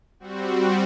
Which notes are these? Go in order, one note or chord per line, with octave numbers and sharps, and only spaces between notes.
G3 C4 F#4